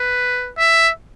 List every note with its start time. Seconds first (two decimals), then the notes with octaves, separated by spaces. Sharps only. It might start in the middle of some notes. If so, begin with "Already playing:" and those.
Already playing: B4
0.58 E5